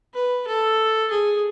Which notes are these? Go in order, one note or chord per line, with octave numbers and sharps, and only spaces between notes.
B4
A4
G#4